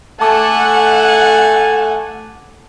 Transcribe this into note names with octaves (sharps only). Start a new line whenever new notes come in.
A3 A4 F#5 G#5 A5 D6